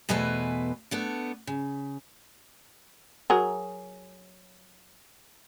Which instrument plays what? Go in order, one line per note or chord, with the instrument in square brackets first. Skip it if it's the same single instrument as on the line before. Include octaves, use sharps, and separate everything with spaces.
[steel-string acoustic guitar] E2 B2 A3 B4 C5 G#5
A3 B3 D4
C#3
[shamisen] F#3 G#4 A#4